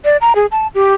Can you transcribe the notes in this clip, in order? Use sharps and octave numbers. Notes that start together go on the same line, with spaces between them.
D5
A#5
G#4
A5
G4